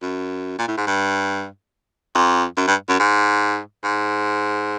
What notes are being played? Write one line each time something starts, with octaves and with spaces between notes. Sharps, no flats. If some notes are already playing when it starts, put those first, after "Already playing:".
F#2
A#2
A2
G#2
G2
F2
F#2
G2
F#2
G#2
G#2